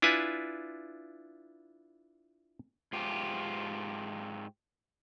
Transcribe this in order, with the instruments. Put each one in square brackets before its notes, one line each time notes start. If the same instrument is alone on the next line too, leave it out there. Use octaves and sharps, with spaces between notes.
[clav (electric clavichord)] D4 E4 F4 B4 G#5
[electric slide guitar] G#2 F4 G4